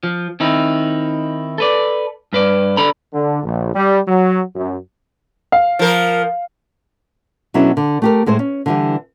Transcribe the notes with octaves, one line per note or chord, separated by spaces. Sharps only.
F3
D#3 C4 D#4 E4
A4 B4 D5
G2 B4 D5
D3 A4 D5 A#5 B5
D3
A#1
G3
F#3
F#2
F5
F3 A#4
B2 F#3 C#4 D4 E4 A4
D3
A3 G4 A#4
A2 G#3 A4 C5
C#4
D3 E3 G3